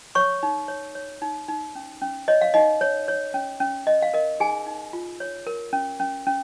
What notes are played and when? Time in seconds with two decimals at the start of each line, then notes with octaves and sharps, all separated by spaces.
0.15 C#5 C#6
0.43 D#4
0.68 C#5
0.95 C#5
1.22 D#4
1.48 D#4
1.75 C#4
2.02 C#4
2.28 C#5 D#5
2.41 F5
2.54 D#4 D#5
2.81 C#5
3.08 C#5
3.34 C#4
3.60 C#4
3.87 C#4 D#5
4.02 F5
4.14 A#4 D#5
4.40 D#4 G#4 G#5
4.66 D#4
4.93 F4
5.20 C#5
5.47 A#4
5.73 C#4
6.00 C#4
6.27 C#4